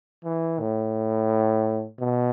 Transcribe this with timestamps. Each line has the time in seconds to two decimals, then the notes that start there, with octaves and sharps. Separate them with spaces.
0.25 E3
0.59 A2
2.00 B2